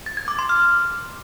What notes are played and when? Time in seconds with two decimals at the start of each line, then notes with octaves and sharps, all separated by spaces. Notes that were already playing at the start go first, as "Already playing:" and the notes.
0.06 A6
0.17 G#6
0.28 D6
0.39 C6
0.49 F6